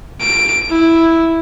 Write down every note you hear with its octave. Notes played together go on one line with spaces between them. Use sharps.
D7
E4